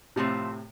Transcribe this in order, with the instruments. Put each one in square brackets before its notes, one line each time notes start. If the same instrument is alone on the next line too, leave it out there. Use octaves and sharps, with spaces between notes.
[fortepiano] A2 C3 [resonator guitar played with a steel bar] F3 A3 C4